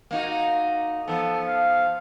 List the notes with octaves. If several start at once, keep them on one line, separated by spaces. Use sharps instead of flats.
A#3 D#4 F#4
F3 B3 A4
F5